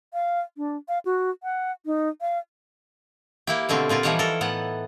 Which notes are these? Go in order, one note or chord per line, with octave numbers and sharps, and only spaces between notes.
F5
D4
F5
F#4
F#5
D#4
F5
A#3 E4 G4
B2 D3 A3 C4 A#4
A#2 C4 F4 A#4
E3 F3 G3 D#4 C#5 F#5
A4 A#4
A2 B3 F#5